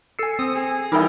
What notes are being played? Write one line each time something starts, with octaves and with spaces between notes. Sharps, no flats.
A4 G#5 E6 C7 C#7
C4 D#6
G#4
E3 G3 B3 D#4 E4 A#4 G5 B5